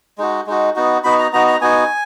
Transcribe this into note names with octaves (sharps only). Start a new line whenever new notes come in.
G#3 D#4 F#4
G#3 D#4 F#4
B3 D#4 F#4
B3 D#4 F#4 B5
A#5
B3 D#4 F#4 A#5
A#5
B3 D#4 F#4 G#5